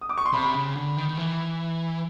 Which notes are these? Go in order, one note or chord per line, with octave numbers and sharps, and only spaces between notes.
D#6
D6
C#6
C6
C3 B5
C#3
D3
D#3
D#3
E3